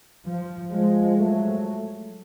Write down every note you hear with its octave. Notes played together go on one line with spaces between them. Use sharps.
F3
F3 G#3
F#3 A3